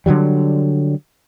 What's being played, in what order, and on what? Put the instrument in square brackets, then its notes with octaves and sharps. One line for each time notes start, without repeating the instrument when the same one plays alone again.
[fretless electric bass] D3 D#3 F#3 G3